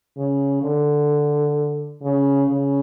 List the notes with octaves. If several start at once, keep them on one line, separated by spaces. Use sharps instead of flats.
C#3
D3
C#3
C#3